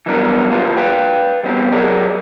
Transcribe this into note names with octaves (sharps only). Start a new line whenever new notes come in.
E3 F#3 G3 B3 D4 A#4
C#2 A#3 F4 G4 B4
B4 F5 G5
E2 G2 B2 C4 G4
F#3 G4 G#4 A#4 C#5 D5